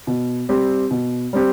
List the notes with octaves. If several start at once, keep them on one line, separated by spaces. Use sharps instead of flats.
B2
G3 C4 G4
B2
G3 C4 G4